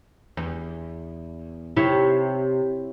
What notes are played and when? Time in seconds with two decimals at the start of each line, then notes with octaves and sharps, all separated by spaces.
0.37 E2
1.76 C3 E4 C#5